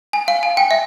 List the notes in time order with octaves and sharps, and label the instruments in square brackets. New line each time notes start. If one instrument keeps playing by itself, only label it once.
[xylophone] G#5
F5
G#5
G5
E5